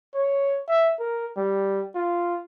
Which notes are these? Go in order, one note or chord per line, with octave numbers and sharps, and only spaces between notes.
C#5
E5
A#4
G3
F4